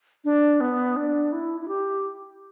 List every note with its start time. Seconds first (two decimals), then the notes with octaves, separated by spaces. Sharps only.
0.25 D4
0.61 B3
0.96 D4
1.33 E4
1.61 E4
1.68 G4